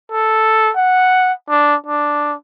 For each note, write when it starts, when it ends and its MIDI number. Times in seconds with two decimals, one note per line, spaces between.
0.12 0.71 69
0.77 1.33 78
1.49 1.75 62
1.86 2.34 62